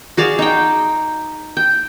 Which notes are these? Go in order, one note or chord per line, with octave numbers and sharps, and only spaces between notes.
F#4 G#4 D5 F5
D#4 G5
G5